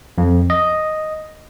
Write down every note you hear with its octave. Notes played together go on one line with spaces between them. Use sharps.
F2
D#5